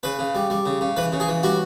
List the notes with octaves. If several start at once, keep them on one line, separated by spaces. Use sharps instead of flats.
C#3 B4
C#3
G3
G3
C#3
C#3
E3 B4
C#3
G#4
E3
G3 F#4